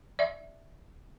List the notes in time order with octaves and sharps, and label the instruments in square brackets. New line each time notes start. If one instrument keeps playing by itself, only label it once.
[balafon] D5 E5